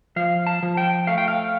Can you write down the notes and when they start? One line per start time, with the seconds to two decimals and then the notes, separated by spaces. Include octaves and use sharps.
0.16 F3 F5
0.47 A5
0.63 F3
0.77 G5
1.07 A3 F5
1.18 G5
1.28 F5